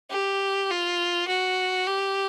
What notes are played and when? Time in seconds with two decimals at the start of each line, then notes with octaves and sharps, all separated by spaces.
0.11 G4
0.70 F4
1.28 F#4
1.87 G4